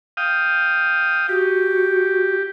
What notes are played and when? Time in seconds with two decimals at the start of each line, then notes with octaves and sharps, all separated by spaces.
0.17 F5 G5 D#6
1.29 F#4 G4